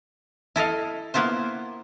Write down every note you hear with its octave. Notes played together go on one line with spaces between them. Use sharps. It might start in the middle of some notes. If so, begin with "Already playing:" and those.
E4 A4 D#5 F5
A#3 B3 E4 F4 C5